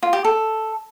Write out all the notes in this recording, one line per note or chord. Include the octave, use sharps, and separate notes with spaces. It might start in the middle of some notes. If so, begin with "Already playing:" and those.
F4
G4
A4